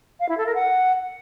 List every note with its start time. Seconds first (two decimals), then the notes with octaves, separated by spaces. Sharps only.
0.20 F5
0.28 E4
0.37 A4
0.46 A#4
0.54 F#5